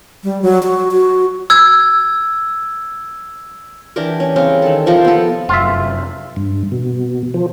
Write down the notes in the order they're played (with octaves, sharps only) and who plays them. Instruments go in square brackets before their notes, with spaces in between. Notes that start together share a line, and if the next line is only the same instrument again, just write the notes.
[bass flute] G3
F#3
F#4
F#4
[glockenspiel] E6 G#6
[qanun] E3 D4 G4 A#4
C#4
C#3 G3 C4 A#4
D#3 A4
C3 F3 A#4 C5
B3 A4
[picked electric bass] F1 F#2 [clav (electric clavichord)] F4 E5
[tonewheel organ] G2
B2
F3